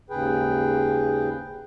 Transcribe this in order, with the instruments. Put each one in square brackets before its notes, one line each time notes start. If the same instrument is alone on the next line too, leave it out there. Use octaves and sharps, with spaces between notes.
[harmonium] D#2 G#2 C#3 G#4 B4 G5